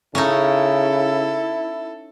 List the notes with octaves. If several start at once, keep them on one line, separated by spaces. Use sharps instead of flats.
C#3 C#4 D#4 E4 A4